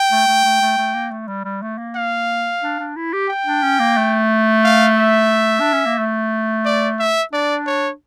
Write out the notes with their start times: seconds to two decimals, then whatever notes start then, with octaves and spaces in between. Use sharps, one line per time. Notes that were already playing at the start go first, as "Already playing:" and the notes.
Already playing: G5
0.11 A3
0.27 A3
0.44 A3
0.61 A3
0.78 A3
0.94 A#3
1.11 A3
1.28 G3
1.44 G3
1.62 A3
1.78 A#3
1.96 F5
2.62 D4
2.79 D4
2.96 E4
3.13 G4
3.29 G5
3.46 D4
3.63 C#4
3.79 A#3
3.97 A3
4.64 F5
4.97 E5
5.60 D4
5.73 C#4
5.86 A#3
5.98 A3
6.65 D5
6.99 E5
7.32 D4 D5
7.66 C#5